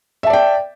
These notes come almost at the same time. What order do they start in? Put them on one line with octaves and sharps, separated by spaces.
E5 A5 D5 G5